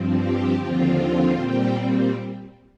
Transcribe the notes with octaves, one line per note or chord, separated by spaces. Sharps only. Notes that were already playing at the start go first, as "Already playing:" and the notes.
Already playing: G2 F3 C4
G4
D#2 D3 F3 C4 F4
A#2 G3 C4 G4